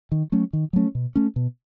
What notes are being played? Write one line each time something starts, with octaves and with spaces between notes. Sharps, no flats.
D#3
F#3 A3 C#4
D#3
F#3 A3 C#4
B2
A3 C#4
B2